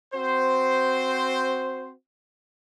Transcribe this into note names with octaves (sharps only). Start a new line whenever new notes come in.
C4 F#4 C5